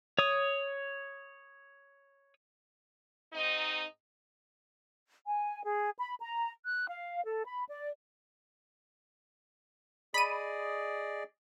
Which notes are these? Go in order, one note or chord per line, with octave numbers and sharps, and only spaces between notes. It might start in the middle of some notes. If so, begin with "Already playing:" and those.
C#5 D#6
G#2 C4 D#4
G#5
G#4
B5
A#5
F#6
F5
A4
B5
D5
G#4 D5 D#5 B5 D#7